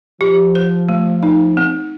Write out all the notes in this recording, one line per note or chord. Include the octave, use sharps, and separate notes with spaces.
F3 G4
C5
A3
D#4
C4